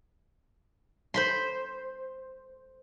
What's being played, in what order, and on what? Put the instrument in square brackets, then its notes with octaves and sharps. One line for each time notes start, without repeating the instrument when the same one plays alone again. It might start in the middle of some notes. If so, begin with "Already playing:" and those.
[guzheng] C5 B5 C6